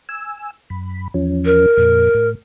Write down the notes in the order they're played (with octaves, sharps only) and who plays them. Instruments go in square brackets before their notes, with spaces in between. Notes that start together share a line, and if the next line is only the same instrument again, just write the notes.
[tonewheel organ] G#5 E6
F#2 B5
E2 F3 C#4
[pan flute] A#4
[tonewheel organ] F2 A#2
A2